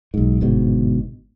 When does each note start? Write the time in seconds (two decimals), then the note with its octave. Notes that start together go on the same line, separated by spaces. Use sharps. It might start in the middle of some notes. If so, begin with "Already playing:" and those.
0.14 B1 G#2
0.41 G1 G#2 B2